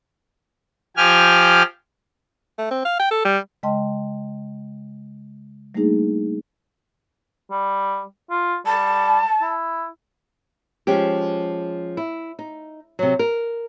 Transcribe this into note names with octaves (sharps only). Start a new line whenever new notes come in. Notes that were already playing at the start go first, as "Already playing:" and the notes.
F3 G4 G#5 F6
A3
C4
F5
G5
A4
G3
C#3 G#3 D#5 G5 A5 C6
G3 A3 A#3 D4 D#4 G#4
G3
F4
G3 A5
E4
F3 G#3 C#4 G4
E4
D#4
C3 F#3
A#4